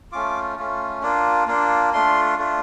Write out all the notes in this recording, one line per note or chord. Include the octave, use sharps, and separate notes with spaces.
A3 C#4 F4 D6
A3 C#4 F4
A#3 D4 F4
A#3 D4 F4
A3 D4 F4 C6
A3 D4 F4